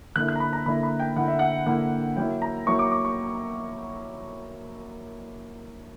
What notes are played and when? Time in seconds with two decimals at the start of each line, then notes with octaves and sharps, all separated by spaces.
0.16 D3 A#3 E4 F#6
0.28 F#6
0.36 A#5
0.40 B5
0.53 A#5
0.66 D3 A#3 E4 B5
0.83 B5
1.00 G5
1.16 D3 A#3 E4 F#5
1.28 E5
1.39 F#5
1.66 D3 A#3 E4 F#5
2.16 F#3 A#3 E4 G5
2.42 A#5
2.67 F#3 A#3 E4 C#6
2.79 D6
2.91 D6
3.05 C#6